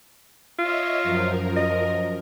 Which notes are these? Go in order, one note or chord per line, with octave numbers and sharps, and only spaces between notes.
F4 C#5 D#5 E5
F#2 F3 A#4
D#5